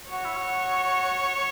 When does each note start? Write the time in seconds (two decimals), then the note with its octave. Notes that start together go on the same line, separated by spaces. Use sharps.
0.11 F#4 C#5
0.25 E4
0.37 F#4